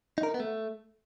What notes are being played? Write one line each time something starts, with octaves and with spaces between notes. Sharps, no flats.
D#4
A#4
D#4
B3
A3